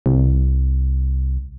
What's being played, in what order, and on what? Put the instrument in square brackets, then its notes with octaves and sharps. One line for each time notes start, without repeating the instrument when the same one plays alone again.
[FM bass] C2